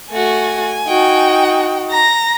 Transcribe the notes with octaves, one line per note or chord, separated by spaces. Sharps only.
A3 F#4 G#5
D#4 F#4 G5
A#5 A#6